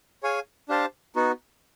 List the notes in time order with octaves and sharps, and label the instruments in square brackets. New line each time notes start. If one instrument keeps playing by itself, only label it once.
[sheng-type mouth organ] G#4 C#5 F5 G#5
D4 G4 C5 F5 A5
B3 D#4 F#4